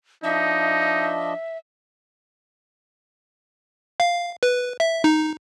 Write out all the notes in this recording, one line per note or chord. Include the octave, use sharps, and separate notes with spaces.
F3 D4 D#4 D#5 E5
F5
B4
E5
D#4